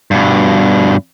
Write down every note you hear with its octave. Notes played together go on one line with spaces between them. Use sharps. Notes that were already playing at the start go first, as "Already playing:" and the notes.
G2 B2